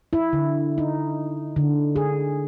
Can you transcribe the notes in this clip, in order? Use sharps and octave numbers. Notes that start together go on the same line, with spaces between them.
E4
D3
D#4
D3
G#4